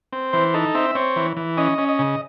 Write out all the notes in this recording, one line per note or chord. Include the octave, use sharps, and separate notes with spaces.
C4
E3 C5
D#4 A4
C4 E5
C4 C#5
E3
E3
C#4 D#5
C#4
D#5
C#3